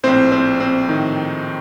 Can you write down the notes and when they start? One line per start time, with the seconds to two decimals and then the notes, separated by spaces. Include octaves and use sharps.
0.03 A#1 A2 C4 C5
0.32 C4 C5
0.60 C4 C5
0.89 A#1 A2 D#3 D#4